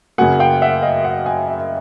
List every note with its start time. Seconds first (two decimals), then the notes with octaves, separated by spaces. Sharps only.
0.18 F#2 C#3 F#3 A#3 F#5 G#5
0.39 F5 G5
0.62 E5 F#5
0.82 D#5 F5
1.04 E5 F#5
1.26 F#5 G#5
1.48 E5